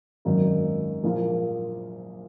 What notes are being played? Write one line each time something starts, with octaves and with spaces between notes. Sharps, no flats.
G#1 F#2 D#3 A#3 D#4
A#1 A#2 F3 A#3